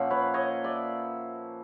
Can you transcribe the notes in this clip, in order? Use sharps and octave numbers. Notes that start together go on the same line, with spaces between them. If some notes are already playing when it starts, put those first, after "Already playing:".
Already playing: A#2 F3 A#3 C#4 E5 F#5
B4 C#5
C#5 D#5
D5 E5